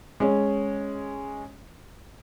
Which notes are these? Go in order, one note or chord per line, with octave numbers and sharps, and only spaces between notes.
G#3 C#4